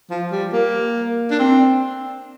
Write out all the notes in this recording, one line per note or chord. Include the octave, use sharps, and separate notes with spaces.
F3
G3
A#3
D4
C4